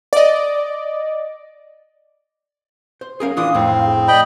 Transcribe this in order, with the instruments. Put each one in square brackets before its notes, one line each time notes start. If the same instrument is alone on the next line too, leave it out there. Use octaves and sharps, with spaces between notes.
[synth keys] D5 D#5
[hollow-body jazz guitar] C5
[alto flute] C#4 [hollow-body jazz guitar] G#4 A#4 F5
[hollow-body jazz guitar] E3 D4 F4 [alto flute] F5 [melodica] D#6
[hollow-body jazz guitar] F2 A2 [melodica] C4
[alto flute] G#4
[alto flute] D5 [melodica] D#5 G5 B5